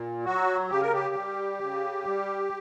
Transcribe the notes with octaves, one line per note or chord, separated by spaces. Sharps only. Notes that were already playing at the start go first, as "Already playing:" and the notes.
Already playing: A#2
F#3 F#4
C#3 G4
A#4
G4
G3
C#3
G3